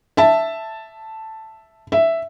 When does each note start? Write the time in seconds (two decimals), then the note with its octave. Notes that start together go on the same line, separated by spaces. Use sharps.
0.17 E5 A5
1.92 E5